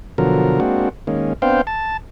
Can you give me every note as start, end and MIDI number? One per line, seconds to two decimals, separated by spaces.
0.18 0.60 47
0.18 0.60 50
0.18 0.60 53
0.18 0.60 54
0.18 0.60 70
0.60 0.89 56
0.60 0.89 58
0.60 0.89 60
0.60 0.89 62
0.60 0.89 66
1.07 1.33 51
1.07 1.33 56
1.07 1.33 58
1.07 1.33 61
1.42 1.61 59
1.42 1.61 60
1.42 1.61 62
1.42 1.61 72
1.42 1.61 77
1.42 1.61 79
1.67 1.97 81